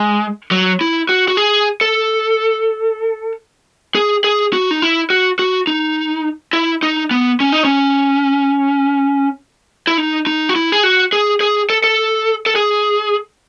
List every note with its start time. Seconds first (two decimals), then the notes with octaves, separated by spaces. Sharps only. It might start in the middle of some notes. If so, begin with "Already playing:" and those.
Already playing: G#3
0.51 F#3
0.81 E4
1.09 F#4
1.28 F#4
1.37 G#4
1.81 A4
3.95 G#4
4.24 G#4
4.53 F#4
4.71 D#4
4.82 E4
5.10 F#4
5.39 F#4
5.67 D#4
6.53 E4
6.83 D#4
7.11 B3
7.40 C#4
7.52 D#4
7.64 C#4
9.87 E4
9.98 D#4
10.27 D#4
10.49 F#4
10.56 E4
10.72 G#4
10.83 F#4
11.13 G#4
11.41 G#4
11.70 A4
11.84 A4
12.46 A4
12.55 G#4